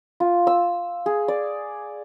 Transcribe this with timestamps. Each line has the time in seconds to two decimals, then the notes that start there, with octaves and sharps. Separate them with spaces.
0.20 F4
0.47 E6
1.06 G#4
1.28 D5